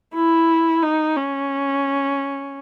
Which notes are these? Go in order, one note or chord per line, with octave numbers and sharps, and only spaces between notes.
E4
D#4
C#4